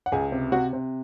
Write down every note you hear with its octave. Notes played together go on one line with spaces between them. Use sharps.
F#5
C#2 G#4 G#5
C3
C3 F#4 F#5
C3